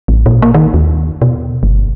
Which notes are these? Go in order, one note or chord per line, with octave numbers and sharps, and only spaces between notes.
A1
A#2
A#3
D#3
D#2
B2
G1